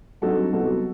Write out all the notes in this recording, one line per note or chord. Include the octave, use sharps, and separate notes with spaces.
G2 F#3 C4 D#4 F#4 A4
C2 B2 F#3 C4 D#4 F#4 A4